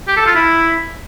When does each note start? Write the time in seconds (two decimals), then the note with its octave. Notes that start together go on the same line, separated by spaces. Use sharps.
0.07 G4
0.16 A4
0.26 F4
0.35 E4